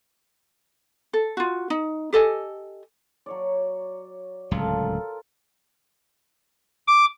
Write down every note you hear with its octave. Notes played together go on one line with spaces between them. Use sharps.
A4
F4 F#4
D#4
G4 A4 D#5 G#5
F#3 C#5 D5
D1 C#2 F#3 F4 A4 A#4
D6